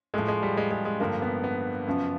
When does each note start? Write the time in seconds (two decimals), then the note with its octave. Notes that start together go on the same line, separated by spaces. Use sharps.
0.14 A2 F3 G#3
0.28 G#3
0.43 G3
0.57 G#3
0.71 G#3
0.85 G#3
1.00 G2 D3 F3 A#3
1.22 B3
1.44 B3
1.87 F#2 C#3 F3